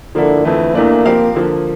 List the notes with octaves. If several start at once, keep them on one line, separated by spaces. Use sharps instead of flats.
D3 F3 A#3 E4 A4
F2 D3 E3 A3
E2 E3 A3 A#3 D4
F3 C4 G4 A#4 F5
D3 F3 A#3